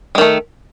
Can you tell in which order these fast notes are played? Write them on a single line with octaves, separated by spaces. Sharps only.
G#3 D#3 A3